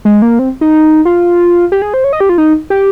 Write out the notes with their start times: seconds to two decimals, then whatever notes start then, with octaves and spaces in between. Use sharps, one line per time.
0.05 G#3
0.22 A#3
0.39 C4
0.61 D#4
1.05 F4
1.72 G4
1.82 G#4
1.94 C5
2.04 C#5
2.13 D#5
2.20 G4
2.29 F4
2.38 D#4
2.70 G4